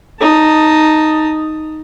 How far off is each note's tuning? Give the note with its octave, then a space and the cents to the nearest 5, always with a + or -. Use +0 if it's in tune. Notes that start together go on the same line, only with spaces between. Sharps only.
D#4 +0 A5 +15